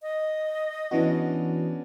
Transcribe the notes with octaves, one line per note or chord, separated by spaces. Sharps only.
D#5
E3 B3 C#4 D4 F#4